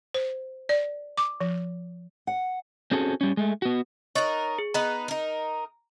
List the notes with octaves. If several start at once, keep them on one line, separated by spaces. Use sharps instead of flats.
C5
D5
D6
F3
F#5
C4 C#4 F#4 G#4 A4
G3 C#4
G#3 A3
B3 F#4
D#4 A#4 C#5 C#6 A6
G#4
B3 D#4 B4 A#5
D#4 A#4